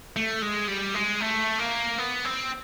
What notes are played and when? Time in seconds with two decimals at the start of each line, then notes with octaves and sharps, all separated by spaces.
0.16 A3
0.42 G#3
0.68 G3
0.94 G#3
1.20 A3
1.59 A#3
1.98 B3
2.25 C4